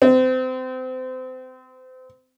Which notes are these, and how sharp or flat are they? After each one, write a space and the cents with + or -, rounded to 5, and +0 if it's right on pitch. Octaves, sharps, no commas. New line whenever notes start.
C4 -30